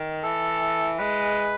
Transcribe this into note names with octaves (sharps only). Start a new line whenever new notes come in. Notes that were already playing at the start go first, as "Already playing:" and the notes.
Already playing: D#3
E3 A4
G#3 B4